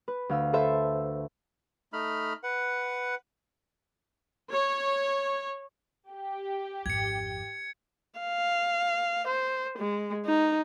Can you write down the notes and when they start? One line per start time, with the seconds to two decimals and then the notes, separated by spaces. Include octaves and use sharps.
0.08 B4
0.29 D2 F5 E6
0.53 A4 B4 C5 E5
1.93 A3 D#4 B5 F6
2.43 B4 F#5
4.52 C#5
6.10 G4
6.86 G#1 F2 G#6 C#7
8.20 F5
9.28 C5
9.79 G#3
10.26 D#4